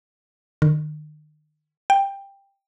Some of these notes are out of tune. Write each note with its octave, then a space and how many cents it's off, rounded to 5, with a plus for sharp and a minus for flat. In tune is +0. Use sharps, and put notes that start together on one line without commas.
D#3 -40
G5 +10